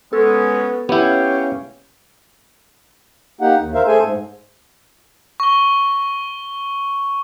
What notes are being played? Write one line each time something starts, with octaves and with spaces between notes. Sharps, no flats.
G#3 B3 C#4 A4
B3 C#4 E4 G4 C#5 F5 G5
A#3 D#4 G4 F#5
D#2
A#4 C5 E5 F5
A3 G#4 A4 C5 E5 G#5
G#2
C#6 G7